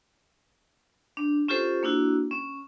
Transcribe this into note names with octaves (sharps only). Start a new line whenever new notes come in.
D4
C#4 F4 G4 A4 C5
A#3 D4 E4 F#4
C#4